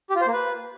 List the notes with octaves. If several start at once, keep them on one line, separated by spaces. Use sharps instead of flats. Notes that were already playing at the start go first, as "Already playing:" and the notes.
G4
F4
C5
A#3
B4